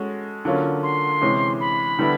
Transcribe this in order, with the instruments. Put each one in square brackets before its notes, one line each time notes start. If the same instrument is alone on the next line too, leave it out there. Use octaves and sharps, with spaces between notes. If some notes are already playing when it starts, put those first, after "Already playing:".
Already playing: [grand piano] G#3 C#4 F#4 A4
D3 F#3 A#3 C#4 F4
[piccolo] C6
[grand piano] C3 E3 G#3 C#4
[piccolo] B5
[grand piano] D3 G3 B3 E4